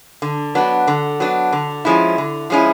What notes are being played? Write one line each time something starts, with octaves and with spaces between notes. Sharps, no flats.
D3
F#3 B3 D4
D3
F#3 B3 D4
D3
F3 G#3 C#4 E4
D3
F3 G#3 C#4 E4